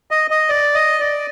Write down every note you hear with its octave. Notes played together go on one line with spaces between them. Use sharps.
D#5
D#5
D5
D#5
D5